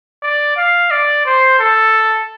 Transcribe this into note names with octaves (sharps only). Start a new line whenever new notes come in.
D5
F5
D5
C5
A4